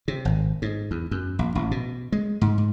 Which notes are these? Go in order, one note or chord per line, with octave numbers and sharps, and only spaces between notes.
C3
G#1
G#2
E2
F#2
A#1
A1
B2
G#3
G#2
G#2